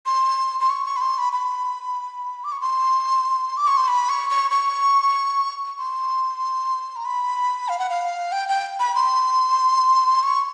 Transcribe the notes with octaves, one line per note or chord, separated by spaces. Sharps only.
C6
C6
C#6
C#6
B5
C6
B5
B5
D6
C#6
C6
D6
C#6
C6
B5
C#6
C#6
C#6
C6
A#5
B5
F5
F#5
F5
G5
G5
B5
C6
C#6